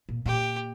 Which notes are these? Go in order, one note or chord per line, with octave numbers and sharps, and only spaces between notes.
A#2
A#2 G4